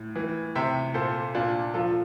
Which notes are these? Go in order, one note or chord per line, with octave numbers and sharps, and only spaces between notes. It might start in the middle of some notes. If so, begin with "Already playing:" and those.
Already playing: A2
E3
C3 E5 G5
A#2 A4 C5
A#2 D4 F4
F3 F4 A4